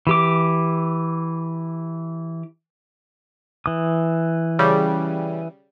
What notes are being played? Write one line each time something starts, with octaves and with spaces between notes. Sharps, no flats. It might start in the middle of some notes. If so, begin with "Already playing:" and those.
E3 G4 D6
E3 D#6
C#3 G3